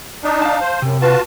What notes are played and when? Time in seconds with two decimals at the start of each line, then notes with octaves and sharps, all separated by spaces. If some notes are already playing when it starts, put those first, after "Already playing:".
0.24 D4 D#4
0.42 F5 A5
0.61 C5
0.82 F#2 C3
1.02 F4 F#4 B4 A5